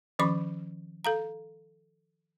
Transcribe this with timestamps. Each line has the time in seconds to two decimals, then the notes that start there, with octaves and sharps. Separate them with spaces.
0.19 D#3 F3 C#4 B5 D6
1.05 A4 F5 A#5